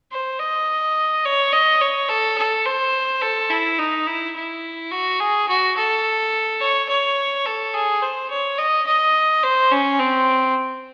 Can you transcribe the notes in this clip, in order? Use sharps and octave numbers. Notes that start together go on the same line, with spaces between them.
C5
D#5
C#5
D#5
C#5
A4
A4
C5
A4
E4
D#4
E4
E4
F#4
G#4
F#4
A4
C#5
C#5
A4
G#4
C5
C#5
D#5
D#5
C5
C#4
C4